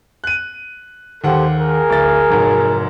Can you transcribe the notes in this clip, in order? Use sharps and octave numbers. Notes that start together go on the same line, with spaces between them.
F#6 D#7
D#2 G4 A4 C5 F#5
G#4 A#4
D1 A6
F1 G#2 F#3